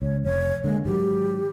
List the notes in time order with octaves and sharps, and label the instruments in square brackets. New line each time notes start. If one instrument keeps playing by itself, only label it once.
[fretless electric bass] C#2 [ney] C#5
[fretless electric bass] F1 [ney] C#5
[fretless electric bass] D3 A#3 [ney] G#3
[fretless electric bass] G#2 D#3 F#3 [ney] G4